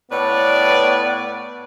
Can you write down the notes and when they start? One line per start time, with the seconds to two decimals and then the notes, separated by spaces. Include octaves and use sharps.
0.11 A2 B3 B4 C#5 D5